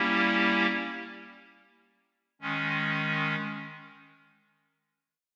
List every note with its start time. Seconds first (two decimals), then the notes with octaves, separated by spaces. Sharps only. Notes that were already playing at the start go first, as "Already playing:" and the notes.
Already playing: G3 A#3 C#4 E4 G4
2.41 D#3 G#3 C#4